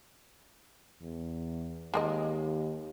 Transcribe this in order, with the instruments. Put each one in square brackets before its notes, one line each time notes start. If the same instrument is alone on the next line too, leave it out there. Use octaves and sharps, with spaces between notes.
[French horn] E2
[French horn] D#2 [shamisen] G#3 G#4 D#5